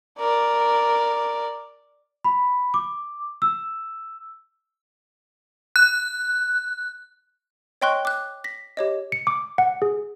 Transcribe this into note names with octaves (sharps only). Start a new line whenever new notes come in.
A#4 D5
B5
D6
E6
F#6
C#5 D#5 G5 C6 C#6 F#6
D6 F#6
A#6 B6
G4 C#5 D#5
C#7
D6
F#5
G#4